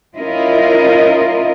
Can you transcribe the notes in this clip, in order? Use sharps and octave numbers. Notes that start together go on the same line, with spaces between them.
C#4 E4 F4 A#4 D#5